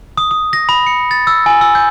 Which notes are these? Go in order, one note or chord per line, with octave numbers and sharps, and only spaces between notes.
D#6
D#6
A#6
B5
C#7
A6
E6
G#5
E6
G6